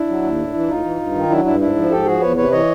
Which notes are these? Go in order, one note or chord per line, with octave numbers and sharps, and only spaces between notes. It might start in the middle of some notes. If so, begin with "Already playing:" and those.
Already playing: D4 E4
F#3
D#2
A2
E3
A2 D#4 F4
E3
G2
D#3
F#3 D4 E4
G2 D4 E4
G#2 D4 E4
F3
G#2 G4 A4
F3 F#4 G#4
E2 B4 C#5
C3 B4 C#5
E3 C#5 D#5